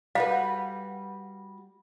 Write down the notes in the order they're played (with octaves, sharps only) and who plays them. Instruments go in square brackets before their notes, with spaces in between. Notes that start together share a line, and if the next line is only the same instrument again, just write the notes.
[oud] G3 F#4 B4 [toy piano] F5